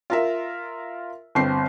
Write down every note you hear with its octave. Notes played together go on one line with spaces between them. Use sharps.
F4 A#4 E5
G1 C4 C7